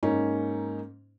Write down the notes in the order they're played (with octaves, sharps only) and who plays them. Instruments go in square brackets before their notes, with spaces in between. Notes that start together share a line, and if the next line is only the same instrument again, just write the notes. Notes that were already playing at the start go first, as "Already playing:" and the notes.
[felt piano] G#2 A#3 C#4 D#4